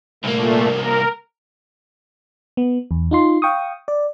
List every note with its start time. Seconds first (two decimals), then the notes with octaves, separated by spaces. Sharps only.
0.24 C2 A#2 A3 A#3
0.77 A#4
2.57 B3
2.91 E2
3.11 D#4 F4 C6
3.42 F5 G5 C#6 D#6
3.88 D5